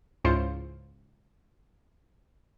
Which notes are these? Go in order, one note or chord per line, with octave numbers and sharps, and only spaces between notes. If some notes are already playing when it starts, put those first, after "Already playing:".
C#2 G#2 E4 F4 C5 C#7